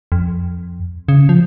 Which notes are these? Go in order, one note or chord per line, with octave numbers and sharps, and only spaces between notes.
F2
C#3
F3